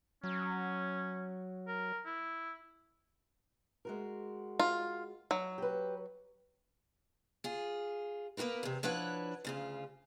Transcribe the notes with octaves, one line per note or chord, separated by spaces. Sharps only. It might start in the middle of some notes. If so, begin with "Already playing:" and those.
F#3 C#4
A#4
E4
G#3 F#4 A#4
F4
F#3
G4 B4
F4 G#4
A#3 B3 F#4 A#4 B4
E2 C3
F3 D4 E4 B4 C#5 F#5
D2 C#3 F4